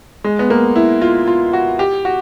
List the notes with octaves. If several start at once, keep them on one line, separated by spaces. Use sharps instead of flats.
G#3
B3
A#3
E4
F4
F4
F#4
G4
F#4